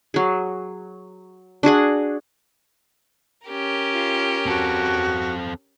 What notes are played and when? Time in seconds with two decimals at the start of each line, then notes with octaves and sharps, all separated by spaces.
0.14 F#3 G#4
1.63 D4 F#4 G#4 F#5
3.47 C#4 G4 A#4
3.93 F4
4.46 C4 F#4 A4